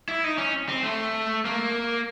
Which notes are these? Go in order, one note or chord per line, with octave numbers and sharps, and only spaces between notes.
E4
D#4
C#4
C4
A3
A#3